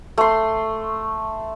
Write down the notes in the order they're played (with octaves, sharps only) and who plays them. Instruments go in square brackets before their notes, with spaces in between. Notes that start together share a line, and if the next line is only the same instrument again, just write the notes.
[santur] A3 C6